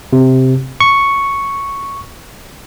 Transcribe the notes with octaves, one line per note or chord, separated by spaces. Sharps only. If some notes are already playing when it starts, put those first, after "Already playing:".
C3
C#6